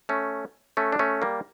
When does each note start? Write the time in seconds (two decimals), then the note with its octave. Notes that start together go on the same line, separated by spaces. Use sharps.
0.09 A3 C#4
0.77 A3 C#4
0.92 D4
0.99 A3 C#4
1.22 G3 A#3